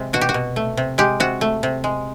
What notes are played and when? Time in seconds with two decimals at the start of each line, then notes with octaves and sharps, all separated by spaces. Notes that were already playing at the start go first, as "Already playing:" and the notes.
Already playing: C3 G#3
0.13 B2 F#4
0.21 G4
0.29 F#4
0.34 B2
0.56 A3
0.77 C3
0.98 G#3 G4
1.20 C3 F#4
1.41 A3
1.63 C3
1.84 G#3